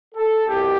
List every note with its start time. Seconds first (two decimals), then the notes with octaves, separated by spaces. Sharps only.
0.15 A4
0.47 C2 B2 G4